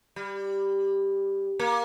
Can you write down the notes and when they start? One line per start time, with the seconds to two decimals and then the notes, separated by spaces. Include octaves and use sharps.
0.16 G3
1.59 A#3